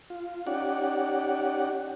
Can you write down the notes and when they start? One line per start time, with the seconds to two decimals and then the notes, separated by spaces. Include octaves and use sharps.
0.10 F4
0.47 C#4 D#4 G4 D5 F#5